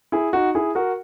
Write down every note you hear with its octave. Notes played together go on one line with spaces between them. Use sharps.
E4 G#4
D#4 F#4
E4 G#4
F#4 A#4